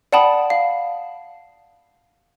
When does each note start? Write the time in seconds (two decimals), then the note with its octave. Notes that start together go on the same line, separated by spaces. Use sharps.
0.13 D5 F#5 G5 A5 B5 D#6
0.50 F5